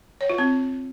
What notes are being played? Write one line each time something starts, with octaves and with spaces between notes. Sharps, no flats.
C#5
F4
C4